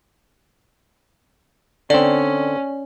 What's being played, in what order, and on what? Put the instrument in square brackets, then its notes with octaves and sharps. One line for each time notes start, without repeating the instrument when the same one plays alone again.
[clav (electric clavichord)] D3 C4 [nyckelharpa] C#4 [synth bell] D5